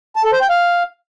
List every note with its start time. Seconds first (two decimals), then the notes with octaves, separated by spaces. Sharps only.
0.16 A5
0.24 A4
0.33 C5
0.41 G5
0.50 F5